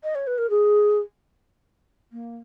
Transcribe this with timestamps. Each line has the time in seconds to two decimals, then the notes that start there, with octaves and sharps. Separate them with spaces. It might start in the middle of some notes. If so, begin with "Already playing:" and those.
0.04 D#5
0.15 C#5
0.27 B4
0.38 A#4
0.50 G#4
2.12 A#3